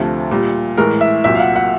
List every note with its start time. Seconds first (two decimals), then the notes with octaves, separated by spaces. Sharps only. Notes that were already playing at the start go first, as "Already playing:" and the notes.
Already playing: D2 C3 F3 A3
0.31 A#2 G3
0.77 A2 E3 G#3 A#4
1.01 E5
1.24 C2 A#2 F#3 E5
1.35 F5
1.40 F#5
1.56 F#5